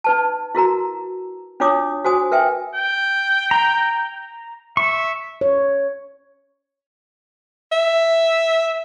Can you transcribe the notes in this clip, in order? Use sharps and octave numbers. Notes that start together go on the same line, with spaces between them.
D#4 B4 A5
E4 F#4 A#4 A#5
D4 D#4 F4 C#5 D6 D#6
F#4 C5 G#5 D#6
A#4 B4 E5 G5 G#5
G5
A#5
E5 C#6
C#5
E5